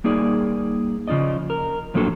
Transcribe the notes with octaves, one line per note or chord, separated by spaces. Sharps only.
G3 A#3 D#4 G#4 D5
C#3 F3 D#4 D5 D#5
A#4
A2 F3 F#3 A#3 D4 A4